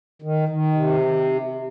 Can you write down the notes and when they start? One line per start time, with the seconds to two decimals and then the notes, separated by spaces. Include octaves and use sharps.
0.22 D#3
0.49 D#3
0.74 C3